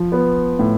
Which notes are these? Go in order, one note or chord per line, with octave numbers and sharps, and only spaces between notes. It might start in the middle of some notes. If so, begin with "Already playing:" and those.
Already playing: F3
B3
A2